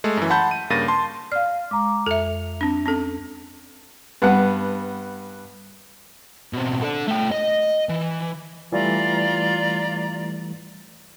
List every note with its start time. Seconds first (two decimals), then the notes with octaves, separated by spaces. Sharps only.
0.04 G#3 A3
0.17 F#2 E3
0.30 F#5 A5 B5 C6 G6
0.51 D#7
0.70 G2 C#3 A#3 A6 A#6 D#7
0.88 A5 C6
1.32 D5 F5 F6
1.71 G#3 A#5 D6
2.06 F2 A4 E5 F7
2.61 C4 D4
2.86 C4 C#4 A4
4.22 G2 B3 F#5
6.53 B2 C4
6.82 A4 D5
7.07 A3 G5
7.31 D#5
7.89 E3
8.72 E3 G3 A3 F4 D5 A#5